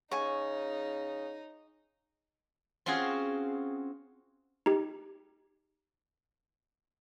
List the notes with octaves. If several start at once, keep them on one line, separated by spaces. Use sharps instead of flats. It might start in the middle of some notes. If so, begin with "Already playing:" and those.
C#3 D#4 G#5 C#6
C4 C#4 F4 F#4 G#4
D#4 G4